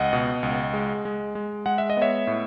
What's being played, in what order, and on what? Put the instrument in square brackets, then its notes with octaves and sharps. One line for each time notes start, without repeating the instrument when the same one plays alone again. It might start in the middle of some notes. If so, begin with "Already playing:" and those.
Already playing: [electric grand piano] C#2 D#5 F#5
B2
C#2
G#3
G#3
G#3
G#3 F#5
E5
D#5
B3 C#5 E5
A2